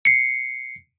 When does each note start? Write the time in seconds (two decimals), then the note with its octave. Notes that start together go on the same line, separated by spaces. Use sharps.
0.05 C7 C#7